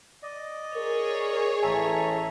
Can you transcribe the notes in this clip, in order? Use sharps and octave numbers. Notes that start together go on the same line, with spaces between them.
D5 D#5
G#4 A#4 C#5
A1 A4 E5 G#5 A#5